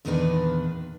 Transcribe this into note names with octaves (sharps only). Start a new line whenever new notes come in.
E2 A#2 D#3 B3 D4 B4